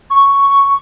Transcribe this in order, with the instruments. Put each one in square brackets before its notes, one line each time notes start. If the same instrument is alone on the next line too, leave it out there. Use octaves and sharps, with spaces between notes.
[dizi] C#6